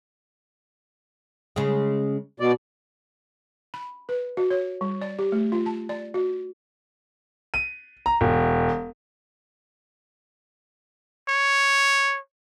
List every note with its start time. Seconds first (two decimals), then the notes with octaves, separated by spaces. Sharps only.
1.56 C#3 G#3
2.40 B2 D5
3.74 B5
4.09 B4
4.37 F#4
4.50 C#5
4.81 G3
5.02 D5
5.19 G4
5.32 A3
5.52 F4
5.66 A5
5.89 D5
6.14 F#4
7.54 D#7
8.06 A#5
8.21 E1
11.29 C#5